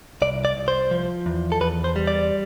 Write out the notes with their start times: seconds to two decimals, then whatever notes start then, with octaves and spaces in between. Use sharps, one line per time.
0.22 C2 D5
0.45 D5
0.57 C2
0.68 C5
0.91 F3
1.26 E2
1.52 A4
1.61 E2 B4
1.84 C5
1.96 G3
2.07 D5